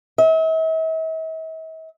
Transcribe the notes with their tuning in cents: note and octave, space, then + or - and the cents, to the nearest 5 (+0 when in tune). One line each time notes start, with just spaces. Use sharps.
E5 -45